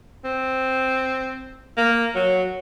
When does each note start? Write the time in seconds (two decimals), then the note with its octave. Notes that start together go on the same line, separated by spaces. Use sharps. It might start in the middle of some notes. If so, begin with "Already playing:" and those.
0.25 C4
1.77 A#3
2.15 F#3